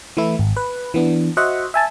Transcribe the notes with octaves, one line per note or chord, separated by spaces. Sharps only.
E3 A3 E4
G#1
B4
E3 B3 D4
F#4 C5 D#5 E5 F#5
E5 G#5 A5